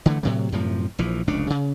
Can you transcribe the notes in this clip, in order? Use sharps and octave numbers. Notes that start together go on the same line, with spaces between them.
D3 E3 G#3 A3
A2 C3 F#3
F#2 A2 C3 F3
A#1 E3 F3
F1 C#2 C#3 D4
C#3